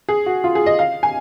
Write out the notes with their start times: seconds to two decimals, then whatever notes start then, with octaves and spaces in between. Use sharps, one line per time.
0.09 G#4
0.26 F#4
0.44 F4
0.55 G#4
0.66 D#5
0.79 F5
1.03 G#5